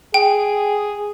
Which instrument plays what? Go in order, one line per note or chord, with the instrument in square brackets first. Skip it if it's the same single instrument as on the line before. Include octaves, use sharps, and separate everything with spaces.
[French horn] G#4 [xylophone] G5